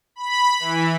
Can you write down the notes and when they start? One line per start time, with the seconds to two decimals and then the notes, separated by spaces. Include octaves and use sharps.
0.16 B5
0.60 E3